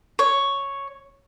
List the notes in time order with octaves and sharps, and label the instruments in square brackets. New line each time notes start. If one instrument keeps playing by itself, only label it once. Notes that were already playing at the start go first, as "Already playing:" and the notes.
[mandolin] C#5